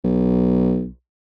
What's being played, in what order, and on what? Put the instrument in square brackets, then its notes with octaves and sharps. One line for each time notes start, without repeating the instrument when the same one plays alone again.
[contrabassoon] B1